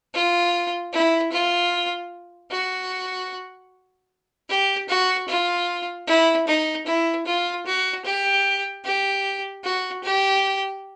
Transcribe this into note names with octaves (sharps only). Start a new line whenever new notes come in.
F4
E4
F4
F#4
G4
F#4
F4
E4
D#4
E4
F4
F#4
G4
G4
F#4
G4